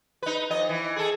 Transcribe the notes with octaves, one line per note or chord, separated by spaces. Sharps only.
D#4 B4
F2 D#5
E3
G#4 A4